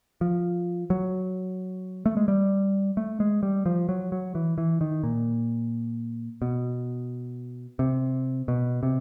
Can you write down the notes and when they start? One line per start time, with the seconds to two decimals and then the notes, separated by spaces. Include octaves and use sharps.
0.21 F3
0.90 F#3
2.06 A3
2.17 G#3
2.28 G3
2.97 A3
3.20 G#3
3.43 G3
3.66 F3
3.89 F#3
4.12 F#3
4.35 E3
4.58 E3
4.81 D#3
5.03 A#2
6.42 B2
7.79 C3
8.48 B2
8.83 C3